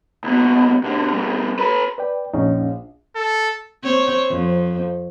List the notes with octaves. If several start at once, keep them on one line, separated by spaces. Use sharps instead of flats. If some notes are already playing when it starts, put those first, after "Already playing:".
C#2 B2
B2 D3
B2 G3
A4 B4
B4 D5 G5
A#1 F2 C#4 D#4
A4
C4 C#5
F2